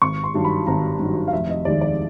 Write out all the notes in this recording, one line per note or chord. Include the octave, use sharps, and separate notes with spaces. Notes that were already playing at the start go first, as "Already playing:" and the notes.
G#1 C#6
C6
G2 D#3 F#3
B5
G#1 A#5
G2 D#3 F#3
F5
F1 E5
D#5
D#2 D#3 G#3 D5
D5